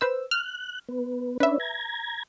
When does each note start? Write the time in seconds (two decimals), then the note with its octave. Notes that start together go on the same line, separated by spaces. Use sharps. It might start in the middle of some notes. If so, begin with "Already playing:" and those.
0.01 B4 C5 E6
0.31 F6 F#6
0.89 B3
1.40 C#4 D4 B4 E5
1.60 A#5 G#6